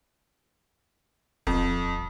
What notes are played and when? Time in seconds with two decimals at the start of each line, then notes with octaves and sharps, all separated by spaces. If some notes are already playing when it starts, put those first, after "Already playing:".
1.47 D#1 F2